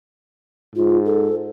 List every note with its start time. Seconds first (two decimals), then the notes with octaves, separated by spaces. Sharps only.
0.76 G#2 F4
1.05 A4